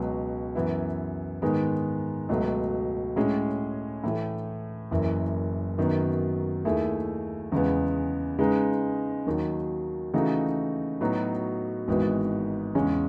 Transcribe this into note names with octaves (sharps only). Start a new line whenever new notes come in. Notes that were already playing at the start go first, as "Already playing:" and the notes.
Already playing: C#2 B2 F#3
F#2 E3 B3 E4
G#2 D#3 G#3 B3
C#2 B2 F#3 A3
A2 G#3 C#4 G#4
A2 E3 A3
F#1 F#2 E3
F#2 D#3 F#3 B3
D#2 D#3 A3 E4 G#4
E2 C#3 G#3 B3
C#3 G#3 D#4 G#4 B4
D#2 D#3 F#3
C#3 E3 A3 D#4 F#4
A2 F#3 B3 D#4 F#4
G#1 G#2 E3 B3 F#4
E2 C#3 G#3 C#4